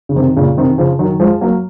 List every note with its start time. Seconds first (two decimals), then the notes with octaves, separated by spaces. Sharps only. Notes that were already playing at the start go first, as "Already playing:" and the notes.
0.09 C#3
0.16 C3 D#3
0.36 A#2 C#3
0.57 C3 D#3
0.78 C#3 F3
0.99 D#3 F#3
1.20 F3 G#3
1.41 F#3 A#3